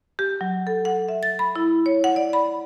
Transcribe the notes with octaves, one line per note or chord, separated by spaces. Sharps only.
G4
F#3
A4
F#5
E5
A6
B5
E4
C#5
F#5
D5
B5